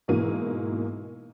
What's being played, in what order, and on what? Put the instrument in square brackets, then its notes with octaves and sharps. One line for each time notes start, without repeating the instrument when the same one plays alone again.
[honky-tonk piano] G#2 B2 E3 A#3 D#7